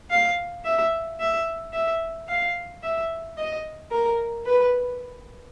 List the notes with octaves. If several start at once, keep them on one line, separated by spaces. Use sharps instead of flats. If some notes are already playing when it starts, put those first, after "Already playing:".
F5
E5
E5
E5
F5
E5
D#5
A#4
B4